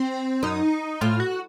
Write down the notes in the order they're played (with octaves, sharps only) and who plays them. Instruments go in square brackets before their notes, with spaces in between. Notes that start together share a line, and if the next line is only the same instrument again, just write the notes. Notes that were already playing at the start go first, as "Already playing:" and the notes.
Already playing: [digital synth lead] C4
[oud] F#2 [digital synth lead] D#4
[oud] A2 [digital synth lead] F4
[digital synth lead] F#4